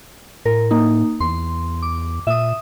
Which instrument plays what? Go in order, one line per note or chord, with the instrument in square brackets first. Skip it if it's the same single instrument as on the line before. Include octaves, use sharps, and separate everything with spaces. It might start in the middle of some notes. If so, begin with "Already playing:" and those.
[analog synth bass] A2 [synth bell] A#4
[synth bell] A#3 D#4
[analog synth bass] E2 [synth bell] C6
[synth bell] D6
[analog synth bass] A#2 [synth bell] E5 D#6